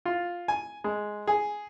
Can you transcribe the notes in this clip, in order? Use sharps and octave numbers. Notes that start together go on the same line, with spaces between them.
F4
G#5
G#3
G#4